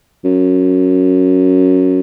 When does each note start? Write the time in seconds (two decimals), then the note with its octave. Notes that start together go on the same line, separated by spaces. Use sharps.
0.25 F#2